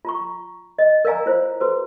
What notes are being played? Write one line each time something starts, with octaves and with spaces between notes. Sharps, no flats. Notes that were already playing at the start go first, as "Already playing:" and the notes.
F4 A#5 C#6
D#5
A#4 D5 F5 G#5 A#5
E4 F4 C5 C#5
F#4 A4 B4 C5